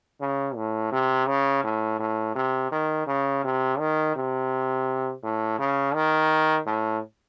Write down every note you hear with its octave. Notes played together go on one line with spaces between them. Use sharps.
C#3
A2
C3
C#3
A2
A2
C3
D#3
C#3
C3
D#3
C3
A2
C#3
D#3
A2